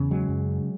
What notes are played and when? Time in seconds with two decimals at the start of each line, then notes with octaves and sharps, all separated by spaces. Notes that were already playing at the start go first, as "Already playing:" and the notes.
Already playing: E2 C#3
0.11 F#3 G#3
0.28 F#2